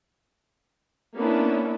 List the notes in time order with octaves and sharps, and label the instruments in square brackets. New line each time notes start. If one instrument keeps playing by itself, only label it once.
[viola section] A#3 B3 C#4 D4 E4